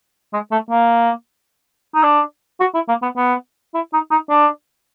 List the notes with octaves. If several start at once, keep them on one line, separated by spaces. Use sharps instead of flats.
G#3
A3
A#3
D#4
D4
F#4
E4
A#3
B3
B3
E4
D#4
D#4
D4